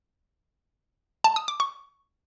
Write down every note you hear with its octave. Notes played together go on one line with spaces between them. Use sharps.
A5
D#6
D6
C#6